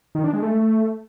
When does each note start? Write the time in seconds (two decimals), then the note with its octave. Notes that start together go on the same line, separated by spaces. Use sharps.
0.15 D#3
0.24 D4
0.33 G#3
0.42 A3